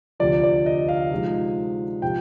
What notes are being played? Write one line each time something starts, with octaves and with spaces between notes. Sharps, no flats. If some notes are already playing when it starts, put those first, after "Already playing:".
D2 C3 F3 D5
D5
D#5
F5
C3 F3 G#3 D#4
C3 F3 G5